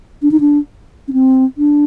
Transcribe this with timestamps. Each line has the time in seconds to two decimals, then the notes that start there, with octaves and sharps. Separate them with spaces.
0.22 D4
0.32 D#4
0.40 D4
1.08 C#4
1.13 C4
1.58 D4